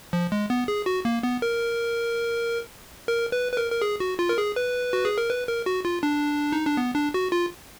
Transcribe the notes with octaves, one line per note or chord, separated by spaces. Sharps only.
F3
G#3
B3
G#4
F#4
A#3
B3
A#4
A#4
B4
B4
A#4
A#4
G#4
F#4
F4
A#4
G#4
B4
F#4
G#4
A#4
B4
A#4
F#4
F4
D4
D#4
D4
B3
D4
F#4
F4